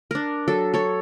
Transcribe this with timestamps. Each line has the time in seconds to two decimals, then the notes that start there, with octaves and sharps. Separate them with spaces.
0.11 D4 A#4
0.48 F#3 A4
0.74 A4 C#5